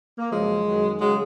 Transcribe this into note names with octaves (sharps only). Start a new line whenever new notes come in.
A#3
F#2 C#3 F3 G#3
F#2 D#3 F#3
C#3 F#3 G#3